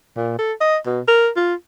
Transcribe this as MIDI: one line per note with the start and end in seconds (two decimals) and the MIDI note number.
0.16 0.36 46
0.38 0.53 69
0.61 0.77 75
0.86 1.00 47
1.08 1.29 70
1.36 1.54 65